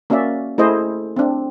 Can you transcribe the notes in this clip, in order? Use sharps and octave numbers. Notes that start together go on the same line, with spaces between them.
A#3 C#4 F#4 D5 E5
A3 E4 G#4 C5 D#5
C4 D4